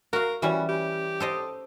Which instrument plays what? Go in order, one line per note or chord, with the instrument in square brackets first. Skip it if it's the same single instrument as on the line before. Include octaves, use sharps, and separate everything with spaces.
[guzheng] F#4 F5 [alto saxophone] A#4
[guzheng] E3 G3 C#4 [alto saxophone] F#4
[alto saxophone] G4
[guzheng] A4 C5 D#5